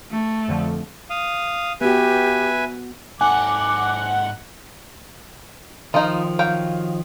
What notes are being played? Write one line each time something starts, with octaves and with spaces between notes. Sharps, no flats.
A3
F2 D3 F3
F5 D#6
B3 F#4 G4 B4 E5 G#5
G#2 D#4 A4 F#5 G#5 D6
D#3 F3 D#4 F4
F#3 F5 G5